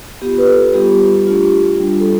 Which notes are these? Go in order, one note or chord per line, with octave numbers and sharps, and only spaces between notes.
B3 F4 G4
B4
A4
G3 B3 F4 G4
A3 D4 F4
G3 D4 F4
A4